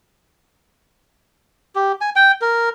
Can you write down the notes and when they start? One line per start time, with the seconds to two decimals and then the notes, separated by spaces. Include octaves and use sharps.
1.75 G4
2.01 G#5
2.16 G5
2.41 A#4